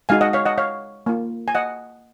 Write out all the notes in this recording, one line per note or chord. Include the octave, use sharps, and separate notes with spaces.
G#3 D#4 F#4 F5 G#5
D#5 F#5
C#5 F5
D#5 F#5
C#5 F5
A#3 F4
G#5
D#5 F#5